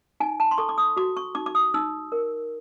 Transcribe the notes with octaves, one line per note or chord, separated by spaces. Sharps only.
D#4 G#5
A5
C6
A4 C#6
D6
D#6
F#4 D6
C#6
D#4 D6
D6
D#6
D#4 E6
A#4